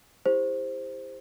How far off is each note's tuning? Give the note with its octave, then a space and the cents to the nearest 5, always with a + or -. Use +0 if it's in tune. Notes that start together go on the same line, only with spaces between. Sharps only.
E4 +0 G4 +45 C5 +0